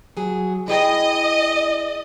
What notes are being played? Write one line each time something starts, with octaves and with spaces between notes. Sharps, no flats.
F#3 G#4
E4 G#4 D#5 G5